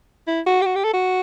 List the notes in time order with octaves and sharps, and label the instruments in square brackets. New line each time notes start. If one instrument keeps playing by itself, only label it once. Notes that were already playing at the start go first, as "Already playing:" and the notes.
[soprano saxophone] E4
F#4
G4
F#4
G4
A4
F#4